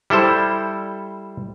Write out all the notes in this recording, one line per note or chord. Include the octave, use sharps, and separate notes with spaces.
G3 E4 A4 C5